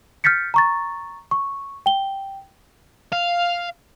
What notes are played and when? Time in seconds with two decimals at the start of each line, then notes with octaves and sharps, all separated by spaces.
0.24 F6 G6 A6 B6 C#7
0.54 A#5 C#6 A6
1.31 C#6
1.86 G5 G7
3.13 F5